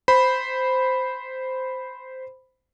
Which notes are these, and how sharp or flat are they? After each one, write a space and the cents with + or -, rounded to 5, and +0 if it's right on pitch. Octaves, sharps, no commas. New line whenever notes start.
C5 -10 B5 +0